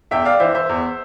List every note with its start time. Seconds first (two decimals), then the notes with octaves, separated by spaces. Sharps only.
0.11 E2 E5 G5
0.25 D5 F5
0.40 E3 C5 E5
0.55 C5 E5
0.69 E2